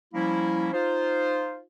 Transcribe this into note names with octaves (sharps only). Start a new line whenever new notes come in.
F3 G3 A#3 C#4 E4
D#4 F4 C5